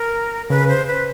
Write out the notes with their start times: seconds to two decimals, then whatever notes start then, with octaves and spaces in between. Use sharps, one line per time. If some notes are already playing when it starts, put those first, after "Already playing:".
Already playing: A#4
0.50 C#3 B4
0.68 C5
0.87 B4